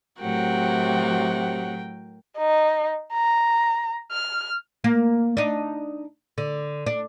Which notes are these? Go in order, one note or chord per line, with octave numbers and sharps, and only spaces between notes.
A2 C3 F#3 F#4 A#4 F#5 G5
D#4
A#5
F6
A#3
D4 D#4
D3
D4